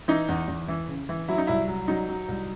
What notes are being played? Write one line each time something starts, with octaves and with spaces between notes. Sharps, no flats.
E3 D#4
E2
E2
E3
C#3
E3
F#3 E4
D#4
C2 E4
F#3
F#3 D#4
F#3
C2